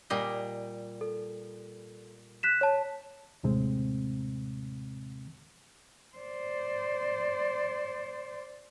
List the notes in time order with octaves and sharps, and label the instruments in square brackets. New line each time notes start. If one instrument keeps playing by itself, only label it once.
[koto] A#2 G3 D#5
[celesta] A4
F#6 B6 E7
C#5 A5
[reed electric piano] D#2 A2 C3 G#3 C4
[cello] C5 D5